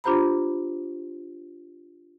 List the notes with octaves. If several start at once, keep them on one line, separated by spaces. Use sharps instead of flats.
D4 F4 G4 C5 A#5 B5